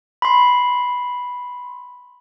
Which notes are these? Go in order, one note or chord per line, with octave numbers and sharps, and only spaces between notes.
B5 C6